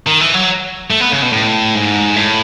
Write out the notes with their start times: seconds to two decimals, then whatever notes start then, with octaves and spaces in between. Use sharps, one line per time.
0.07 D#3
0.20 E3
0.34 F#3
0.90 A3
1.00 B3
1.12 C#3
1.22 B2
1.32 A2
1.75 G#2
2.16 A2